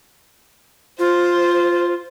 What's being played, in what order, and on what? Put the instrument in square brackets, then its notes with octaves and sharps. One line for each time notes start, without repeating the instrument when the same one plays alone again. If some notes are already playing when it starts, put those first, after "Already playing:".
[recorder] F4 [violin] C5